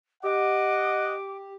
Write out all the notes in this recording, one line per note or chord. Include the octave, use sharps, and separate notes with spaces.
G4 D#5 F#5 D6